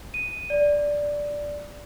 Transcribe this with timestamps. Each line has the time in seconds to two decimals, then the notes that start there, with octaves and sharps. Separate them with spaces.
0.14 D#7
0.50 D5